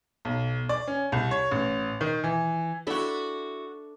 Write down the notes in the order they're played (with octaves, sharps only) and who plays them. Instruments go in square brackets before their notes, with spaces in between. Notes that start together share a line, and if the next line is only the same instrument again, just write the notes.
[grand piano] B1
D5
C#4
C2
C#5
A1
D#3
E3
[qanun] D4 A4 B5 [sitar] E4 F#4